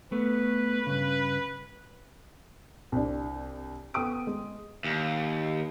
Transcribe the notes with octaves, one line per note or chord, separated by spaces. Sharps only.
A3 B3 B4
G2 C#3
C2 D4
B3 A4 G5 D#6 D7
G#3
D#2